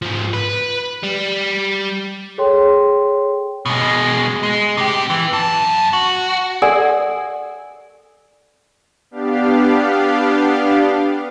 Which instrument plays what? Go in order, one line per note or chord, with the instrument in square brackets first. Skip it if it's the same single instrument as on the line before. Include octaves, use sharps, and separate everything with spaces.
[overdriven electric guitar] G#2 F3
B4
G3
[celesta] G#4 A4 C#5 G5 C6
[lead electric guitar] B2 G#3
G#3
C3 G4
E3
F#2 A5
F#4
[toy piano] A4 A#4 D5 F#5 G#5
[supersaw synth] B3 D4 G4 F5